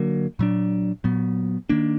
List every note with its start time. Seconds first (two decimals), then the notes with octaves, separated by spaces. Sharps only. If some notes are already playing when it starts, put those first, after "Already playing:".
Already playing: D3 F#3 A#3
0.39 A#2 F#3 D4
1.04 A#2 F#3 B3
1.69 D#3 A#3 D4